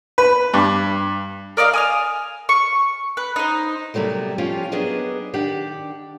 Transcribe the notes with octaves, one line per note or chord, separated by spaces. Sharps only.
B4
G2
A#4 D5 D#5 F5
G#5 D#6 F6
C#6
B4
D#4 C5
C3 F#3 G3 A3 A#3
F3 C#4 F4 G4 C#5
F#3 A#3 B3 D4 G#4 D#5
D#3 D4 G4 F#5